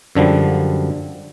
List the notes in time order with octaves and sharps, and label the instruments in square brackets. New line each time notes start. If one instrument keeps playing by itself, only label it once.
[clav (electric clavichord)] F#2 D3 F3 G3